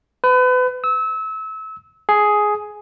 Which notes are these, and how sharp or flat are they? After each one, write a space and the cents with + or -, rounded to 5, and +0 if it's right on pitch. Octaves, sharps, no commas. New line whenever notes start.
B4 +35
E6 -30
G#4 +10